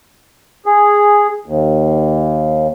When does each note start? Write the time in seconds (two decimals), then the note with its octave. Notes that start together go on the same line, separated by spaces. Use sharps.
0.66 G#4
1.46 D#2